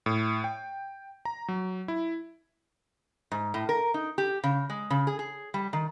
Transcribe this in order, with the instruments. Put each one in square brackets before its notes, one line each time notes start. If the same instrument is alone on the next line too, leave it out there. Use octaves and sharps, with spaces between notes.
[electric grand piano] A2
G5
A#5
F#3
E4
[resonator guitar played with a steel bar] G#2
A2
A#4
D#4
G4
C#3
G#3
C#3
G#4
G#4
G3
D#3